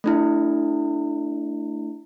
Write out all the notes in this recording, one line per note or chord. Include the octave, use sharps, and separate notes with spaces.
A3 D4 E4